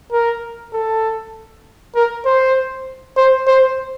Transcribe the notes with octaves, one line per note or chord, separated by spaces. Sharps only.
A#4
A4
A#4
C5
C5
C5